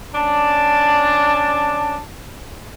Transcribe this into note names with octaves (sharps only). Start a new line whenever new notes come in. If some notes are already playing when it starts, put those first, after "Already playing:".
C#4 D4 D5 A5